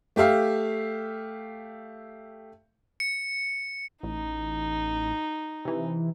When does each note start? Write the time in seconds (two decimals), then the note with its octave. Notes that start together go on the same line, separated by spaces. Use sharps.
0.16 A3 G4 E5 F5
3.00 C#7
4.03 A1 D#4
5.65 C3 E3